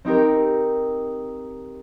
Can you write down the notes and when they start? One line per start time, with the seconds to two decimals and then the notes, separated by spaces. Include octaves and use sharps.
0.05 C4 D#4 G4 A#4